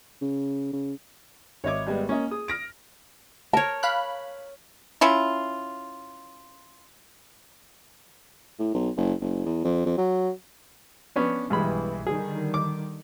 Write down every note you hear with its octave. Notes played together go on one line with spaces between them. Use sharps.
C#3
C#3
G#1 C#5 D#5 E5 D6 G#6
G3 G#3 B3
A#3 C#4 D#5
G#4 D#6
F6 A#6 D7
A#4 C#5 A5
F5 B5 F#6
C#4 E4 F4
A2
B1
F#1
F#1
E2
F2
F2
F#3
B3 C#4 D4
B1 G2 E3 G#3 B5
D3 D#3 G3 G#4
D6